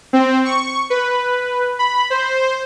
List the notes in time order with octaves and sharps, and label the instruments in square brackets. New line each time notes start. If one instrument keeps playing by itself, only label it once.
[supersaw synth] C4
C#6
B4
B5
C5